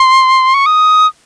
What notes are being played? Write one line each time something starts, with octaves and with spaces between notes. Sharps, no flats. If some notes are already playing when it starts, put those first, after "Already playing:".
Already playing: C6
C#6
D#6